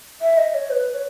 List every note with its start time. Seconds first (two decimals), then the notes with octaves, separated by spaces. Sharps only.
0.21 E5
0.38 D#5
0.54 C#5
0.70 B4
0.94 C#5